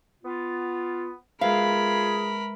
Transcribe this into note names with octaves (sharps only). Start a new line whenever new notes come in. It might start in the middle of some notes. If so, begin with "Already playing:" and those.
B3 F4
G#3 F4 G#4 A#4 B4 E5 F5 B5